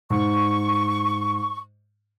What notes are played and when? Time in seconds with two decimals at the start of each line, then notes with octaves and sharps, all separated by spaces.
0.10 G#2 C#6